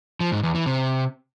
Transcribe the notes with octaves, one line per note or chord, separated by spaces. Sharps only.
F3
G#2
E2
E3
C3